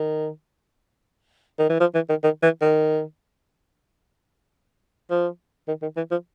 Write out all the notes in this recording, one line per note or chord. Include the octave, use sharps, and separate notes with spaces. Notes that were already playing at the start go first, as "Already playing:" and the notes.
Already playing: D#3
D#3
E3
F3
E3
D#3
D#3
E3
D#3
F3
D#3
D#3
E3
F3